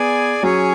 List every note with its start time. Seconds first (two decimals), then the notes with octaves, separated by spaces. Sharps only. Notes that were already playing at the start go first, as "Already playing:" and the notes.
Already playing: B3 G#4 D5 G#5
0.42 F#3 C#4 G#4 C#5